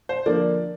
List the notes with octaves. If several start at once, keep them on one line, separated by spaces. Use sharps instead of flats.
C5
D3 F3 A#3 D5